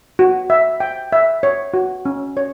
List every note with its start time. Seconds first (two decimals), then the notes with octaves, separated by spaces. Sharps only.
0.19 F#4
0.50 E5
0.80 G5
1.12 E5
1.43 C#5
1.74 F#4
2.05 C#4
2.37 C#5